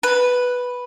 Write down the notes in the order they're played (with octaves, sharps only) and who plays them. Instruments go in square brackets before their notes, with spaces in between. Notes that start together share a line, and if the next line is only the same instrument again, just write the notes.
[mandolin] B4